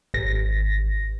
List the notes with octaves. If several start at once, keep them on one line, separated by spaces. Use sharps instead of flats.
G#1 A#6